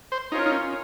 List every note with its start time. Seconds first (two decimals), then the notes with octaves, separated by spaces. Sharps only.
0.12 C5
0.32 C#4 D#4 F4 A#4 C#5
0.46 D#4
0.52 C#4